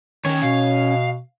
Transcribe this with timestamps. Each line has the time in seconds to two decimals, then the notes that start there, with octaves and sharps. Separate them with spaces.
0.25 D#3 A#3 C#4 C#5
0.42 B2 F5